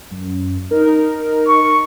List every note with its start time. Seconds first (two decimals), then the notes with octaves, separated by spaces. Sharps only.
0.11 F#2
0.71 D#4 A#4
1.48 C#6